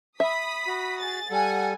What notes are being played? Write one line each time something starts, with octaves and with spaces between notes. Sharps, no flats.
E5 B5 D#6 B6
F#4
G#4 A6
G3 A4 F#5 G#5